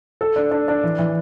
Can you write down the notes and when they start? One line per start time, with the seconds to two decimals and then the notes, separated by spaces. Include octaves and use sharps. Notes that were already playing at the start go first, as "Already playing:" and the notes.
0.21 A4
0.36 D4
0.51 D4
0.68 D4
0.83 E3
0.99 E3